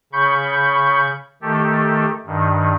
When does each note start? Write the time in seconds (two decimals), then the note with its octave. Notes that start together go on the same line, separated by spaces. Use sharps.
0.13 C#3 B5 C#6 G6
1.42 D#3 A3 G4 A4
2.26 G2 D#3